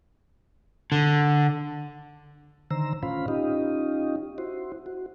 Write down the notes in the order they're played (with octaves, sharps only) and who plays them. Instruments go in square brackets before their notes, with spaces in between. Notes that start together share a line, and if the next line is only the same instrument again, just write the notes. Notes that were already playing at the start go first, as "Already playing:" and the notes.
[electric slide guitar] D3
[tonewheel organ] D3 D#3 C5 A#5 E6
A2 C#4 F4 C5 F5 B5
C#4 D#4 F4 G4 D#5
E4 F#4 C5
F#4